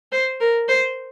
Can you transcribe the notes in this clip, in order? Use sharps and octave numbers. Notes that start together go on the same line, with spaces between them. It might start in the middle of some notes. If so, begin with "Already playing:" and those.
C5
A#4
C5